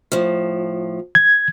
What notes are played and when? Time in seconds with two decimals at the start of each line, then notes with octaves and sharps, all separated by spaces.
0.12 A2 F3
1.15 G#6